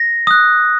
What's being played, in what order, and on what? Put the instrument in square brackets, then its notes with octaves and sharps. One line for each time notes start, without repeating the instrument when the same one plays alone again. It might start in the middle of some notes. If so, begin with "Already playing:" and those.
Already playing: [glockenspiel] A#6
D#6 F#6